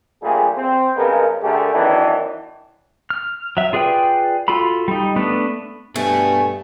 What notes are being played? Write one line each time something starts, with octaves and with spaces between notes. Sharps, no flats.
A#1 A#2 G3 A3 G#4
C4
G2 C#3 G#3 B3 A#4
D3 A3 G4 G#4 A#4
D#3 E3 F#3 B3 C#4 D4
F6
F#3 E5
F4 G#4 B4 D5 G5
F4 F#4 A4 B5
G3 D#4
A3 B3 D4 B4
G2 B2 A3 G#5